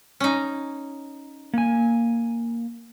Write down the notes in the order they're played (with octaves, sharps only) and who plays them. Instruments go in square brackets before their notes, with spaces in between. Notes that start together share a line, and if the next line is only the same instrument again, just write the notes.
[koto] C#4 D#4
[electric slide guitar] A#3 G#5